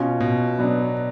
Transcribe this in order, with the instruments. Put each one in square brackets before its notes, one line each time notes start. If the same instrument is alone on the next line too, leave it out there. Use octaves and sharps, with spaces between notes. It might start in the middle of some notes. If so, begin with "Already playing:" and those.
Already playing: [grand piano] B2 [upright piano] C#4 F4
[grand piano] B2
[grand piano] F#3 [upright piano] B3 D4